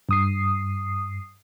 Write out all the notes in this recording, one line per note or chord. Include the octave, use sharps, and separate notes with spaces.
G2 D#6 C7